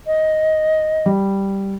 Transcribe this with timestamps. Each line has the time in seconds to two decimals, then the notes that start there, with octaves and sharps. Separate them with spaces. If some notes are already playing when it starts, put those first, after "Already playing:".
0.07 D#5
1.06 G3